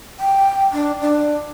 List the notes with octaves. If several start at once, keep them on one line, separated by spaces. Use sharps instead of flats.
G5
D4
D4